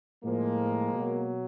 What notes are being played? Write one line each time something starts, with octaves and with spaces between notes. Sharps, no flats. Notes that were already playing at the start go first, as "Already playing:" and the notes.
A2 F3 G#3 A#3
B2 F#3